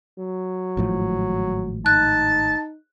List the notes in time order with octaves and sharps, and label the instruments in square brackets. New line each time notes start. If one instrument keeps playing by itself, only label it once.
[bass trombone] F#3
[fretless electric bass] G#1 A2 F3
[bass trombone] D#4 [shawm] A5 [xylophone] F#6